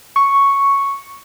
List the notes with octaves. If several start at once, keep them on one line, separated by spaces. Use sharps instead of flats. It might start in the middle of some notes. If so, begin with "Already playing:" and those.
C#6